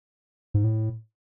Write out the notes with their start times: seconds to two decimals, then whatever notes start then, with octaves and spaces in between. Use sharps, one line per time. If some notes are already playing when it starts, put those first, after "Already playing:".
0.54 G#2
0.64 A2